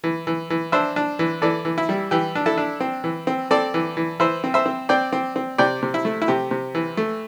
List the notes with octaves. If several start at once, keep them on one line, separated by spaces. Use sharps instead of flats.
E3
E3
E3
D4 C5 E5
D4
E3
E3 A4 D5
E3
E4
G3
E3 G4
D4
E4 A4
D4
C4
E3
C4
C4 A4 D5
E3
E3
E3 C5 E5
C4
C5 E5
C4
C4 D5 G5
C4
C4
C3 D5 G5
C3
E4
A3
E4
C3 G4
C3
E3
A3